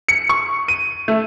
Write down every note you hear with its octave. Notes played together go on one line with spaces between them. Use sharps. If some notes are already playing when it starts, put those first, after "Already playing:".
C#7
C#6
D#7
A3